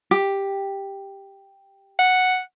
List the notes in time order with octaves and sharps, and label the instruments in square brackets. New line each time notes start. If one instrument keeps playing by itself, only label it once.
[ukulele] G4
[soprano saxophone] F#5